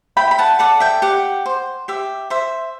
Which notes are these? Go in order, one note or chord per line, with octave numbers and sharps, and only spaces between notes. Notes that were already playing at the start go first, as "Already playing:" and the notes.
E4 G5 B5
B5
F#5 A5
A4 D5 F#5
E5 G5
G4 F#5
C5
G4 E5
C5 E5